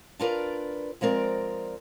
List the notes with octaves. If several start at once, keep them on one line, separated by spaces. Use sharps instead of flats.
D4 F4 A#4 B4 D5
F3 G#3 C4 A#4 D5